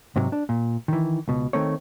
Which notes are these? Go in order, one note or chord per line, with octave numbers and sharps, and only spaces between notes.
G#2 C3 F#3
D4
A#2
D#3 E3
C#2 B2
D#3 A3 C4 C#5